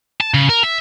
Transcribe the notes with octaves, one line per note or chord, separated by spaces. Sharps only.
A5
C#3
A#4
E5